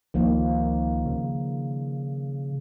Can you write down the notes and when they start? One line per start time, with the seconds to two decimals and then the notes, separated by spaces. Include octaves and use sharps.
0.14 C#2 D#3 F3 A#3
1.05 C#3